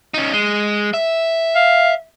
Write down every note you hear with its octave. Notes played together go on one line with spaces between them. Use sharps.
C#4 D#4
G#3
E5
F5